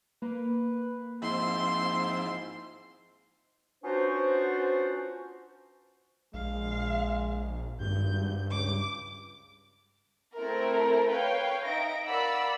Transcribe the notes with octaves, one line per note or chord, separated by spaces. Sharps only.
A#3 B4
G#2 F3 C4 E4 C6
B3 C#4 D4 F4 F#4 C5
A#1 G#3 F5
G#1 G2 G6
C#2 D6
A3 C4 E4 A4 A#4
B4 C#5 F5 G5
D#4 E5 A#6 D7
A#4 D5 F5 F#5 B5 E6